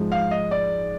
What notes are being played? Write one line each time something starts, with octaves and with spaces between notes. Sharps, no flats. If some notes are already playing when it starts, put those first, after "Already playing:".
Already playing: G#2 F3 G#3
F5
D#5
D5